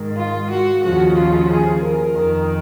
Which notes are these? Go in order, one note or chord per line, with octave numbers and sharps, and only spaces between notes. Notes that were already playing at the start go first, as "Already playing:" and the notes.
Already playing: G#2 D#3
F4
F#4
D#2 C#3 F3 F#4
F4
G#4
A#4
F2 D#3